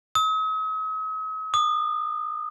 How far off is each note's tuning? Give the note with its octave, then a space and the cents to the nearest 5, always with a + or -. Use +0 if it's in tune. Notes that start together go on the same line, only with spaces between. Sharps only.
D#6 +45
D#6 -30